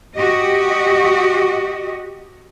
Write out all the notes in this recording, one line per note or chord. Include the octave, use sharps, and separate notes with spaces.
F#4 G4 D#5